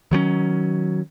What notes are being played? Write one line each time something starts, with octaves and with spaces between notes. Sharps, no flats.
D#3 F#3 G3 C#4